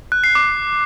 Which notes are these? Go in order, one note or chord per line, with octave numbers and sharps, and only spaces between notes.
F#6
C7
D6